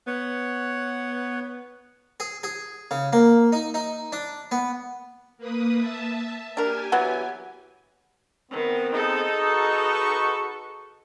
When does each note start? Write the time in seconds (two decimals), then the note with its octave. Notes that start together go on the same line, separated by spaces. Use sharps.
0.07 B3 C#5 F#5
2.20 G#4
2.43 G#4
2.91 C#3
3.13 A#3
3.52 D#4
3.74 D#4
4.13 D4
4.51 B3
5.38 A#3 B4 D#6
5.78 E5 A5
6.57 D4 G4 A#4 G#5
6.92 E3 F#3 B3
8.51 D#3 B3 C4
8.94 D#4 G#4 A4
9.38 F#4 B4 C#6